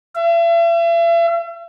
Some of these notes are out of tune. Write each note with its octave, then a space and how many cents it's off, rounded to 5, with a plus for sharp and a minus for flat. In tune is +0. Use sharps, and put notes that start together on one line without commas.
E5 +40